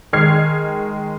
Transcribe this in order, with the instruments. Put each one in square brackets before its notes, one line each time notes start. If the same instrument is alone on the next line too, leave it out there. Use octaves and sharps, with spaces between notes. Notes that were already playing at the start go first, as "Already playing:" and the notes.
[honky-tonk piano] D#3 G#3 F6 G#6 C7